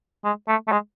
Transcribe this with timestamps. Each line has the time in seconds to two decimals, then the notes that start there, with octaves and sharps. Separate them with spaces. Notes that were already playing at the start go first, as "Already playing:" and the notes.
0.24 G#3
0.48 A3
0.68 A3
0.72 G#3